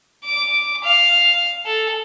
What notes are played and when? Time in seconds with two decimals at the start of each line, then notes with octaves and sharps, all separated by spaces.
0.24 D6
0.84 F5
1.66 A4